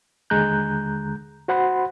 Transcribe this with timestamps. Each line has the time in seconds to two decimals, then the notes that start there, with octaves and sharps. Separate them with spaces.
0.30 D#2 D3 G#3 A#5 F#6 G6
1.48 F#4 C5 F#5 B5 C6